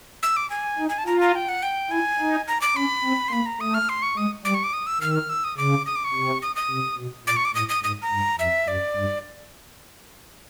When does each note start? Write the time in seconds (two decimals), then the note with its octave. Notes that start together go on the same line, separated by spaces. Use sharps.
0.23 E6
0.37 D6
0.50 G#5
0.78 D#4
0.89 G#5
0.98 A5
1.07 F4 A#5
1.21 A#5
1.35 G5
1.49 F#5
1.63 G5
1.91 E4 G#5
2.19 D#4
2.48 A#5
2.61 D6
2.76 C#4 B5
3.04 C4
3.28 C6
3.32 A#3 B5
3.46 A#5
3.61 A3 D#6
3.74 F6
3.89 C6
4.02 C#6
4.17 G#3 D#6
4.45 G3 D6
4.54 C#6
4.64 D6
4.73 D#6
4.87 E6
5.01 D#3 F6
5.11 E6
5.15 F6
5.30 E6
5.44 D#6
5.57 C#3 D6
5.86 D#6
5.96 D6
6.04 C#6
6.14 C3
6.42 D#6
6.56 D#6
6.71 C3
6.98 B2
7.26 A#2 D6
7.36 C#6
7.45 D6
7.54 A2 D#6
7.69 D#6
7.84 G#2 D#6
8.02 A#5
8.12 G2
8.39 F2 E5
8.68 F#2 D5
8.96 G2